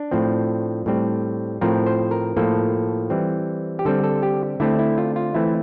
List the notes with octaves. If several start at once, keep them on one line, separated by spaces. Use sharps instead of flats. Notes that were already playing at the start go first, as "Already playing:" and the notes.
Already playing: D4
A2 F3 C4
A2 G3 C4
A2 F3 C4 A#4
C5
A#4
A2 F3 A#3 A4
E3 G3 C4
G4
D3 G3 C4 A4
A4
G4
D3 A3 C4 E4
E4
F4
F4
E3 A3 C4 E4